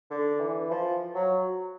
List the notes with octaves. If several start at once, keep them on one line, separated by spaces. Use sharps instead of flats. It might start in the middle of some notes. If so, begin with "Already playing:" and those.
D3
E3
F3
F#3